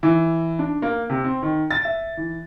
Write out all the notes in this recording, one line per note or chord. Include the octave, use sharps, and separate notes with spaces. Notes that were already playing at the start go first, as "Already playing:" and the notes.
E3
D4
A#3
C3
C4
D#3
A6
E5
E3